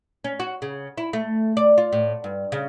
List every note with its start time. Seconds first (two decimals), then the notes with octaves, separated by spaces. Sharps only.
0.24 C#4
0.40 F#4
0.62 C#3
0.98 E4
1.13 A3
1.57 D5
1.78 F4
1.93 A2
2.24 G2
2.52 C#3